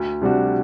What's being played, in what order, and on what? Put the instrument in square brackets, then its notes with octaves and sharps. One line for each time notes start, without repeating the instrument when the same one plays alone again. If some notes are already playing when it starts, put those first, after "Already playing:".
Already playing: [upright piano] D2
C3 G3 D4 F#4